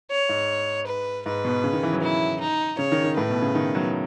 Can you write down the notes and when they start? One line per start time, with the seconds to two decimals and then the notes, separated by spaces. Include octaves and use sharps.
0.11 C#5
0.29 G#2
0.87 B4
1.26 G#2 B4
1.45 B2
1.64 C#3
1.73 D#3
1.83 E3
1.93 F#3
2.02 E4
2.41 D#4
2.79 C#3 C#5
2.92 D#3
3.04 D#3
3.17 A2 B4
3.30 B2
3.42 C#3
3.55 D#3
3.75 F#3